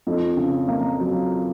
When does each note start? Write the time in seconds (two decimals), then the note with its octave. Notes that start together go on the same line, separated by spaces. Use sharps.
0.07 F2
0.37 C#3
0.68 A#3
0.99 F#3